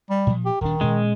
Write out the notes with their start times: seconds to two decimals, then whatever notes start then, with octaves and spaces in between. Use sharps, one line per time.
0.10 G3
0.27 A#2 F3
0.46 G4
0.61 D#1 D#3 D4
0.81 A#2 G#3 C#4